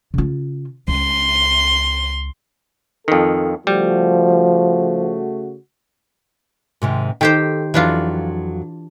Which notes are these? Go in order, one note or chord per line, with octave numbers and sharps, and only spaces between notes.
C#3 F4
C#2 C6
F2 D#3 A4
C#3 F3 G3 A3 F#4
G#2 C3 D#3
D#3 G4 A4 C5 G5
F2 E3 F#3 D4 F4